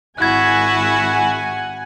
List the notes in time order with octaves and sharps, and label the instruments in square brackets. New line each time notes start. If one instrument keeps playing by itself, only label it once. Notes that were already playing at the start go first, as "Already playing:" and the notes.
[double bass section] G#1 [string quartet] E4 F#4 [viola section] F#5 G#5 [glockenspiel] F#6 G#6